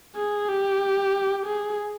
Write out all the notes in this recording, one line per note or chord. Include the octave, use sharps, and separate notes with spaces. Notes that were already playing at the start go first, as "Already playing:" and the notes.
G#4
G4
G#4